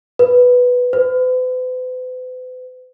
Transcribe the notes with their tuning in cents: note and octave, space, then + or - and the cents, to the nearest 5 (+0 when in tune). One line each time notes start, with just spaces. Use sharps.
B4 +0
B4 +45